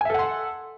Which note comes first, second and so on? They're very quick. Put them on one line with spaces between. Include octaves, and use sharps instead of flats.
G#5 E5 A4 F#5 C6